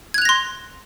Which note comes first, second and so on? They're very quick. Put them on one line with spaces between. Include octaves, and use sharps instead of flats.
G#6 F#6 F7 A#6 C6